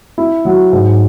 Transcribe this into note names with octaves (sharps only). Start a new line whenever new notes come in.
E4
F#3
G#2